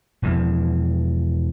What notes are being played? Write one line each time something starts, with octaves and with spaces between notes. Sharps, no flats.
E1 E2 E3 F3